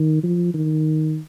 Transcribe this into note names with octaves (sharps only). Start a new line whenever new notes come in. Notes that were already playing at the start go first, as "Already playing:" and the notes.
Already playing: D#3
F3
D#3